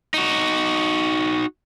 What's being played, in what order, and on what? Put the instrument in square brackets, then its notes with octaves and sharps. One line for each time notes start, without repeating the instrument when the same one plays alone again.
[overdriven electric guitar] D#4 F#4